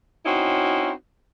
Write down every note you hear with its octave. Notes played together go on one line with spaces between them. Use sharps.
C4 C#4 D#4 E4 F#4